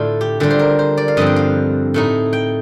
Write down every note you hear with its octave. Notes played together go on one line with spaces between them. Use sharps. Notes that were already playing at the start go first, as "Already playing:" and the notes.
Already playing: A2 D3 A3 D4 F4 A4
G4
D3 G3 D4 F4 G4
C5
A#4
C5
D5
F5
G2 D3 F3 C4 D#5
G5
F5
A2 A3 D#4
G5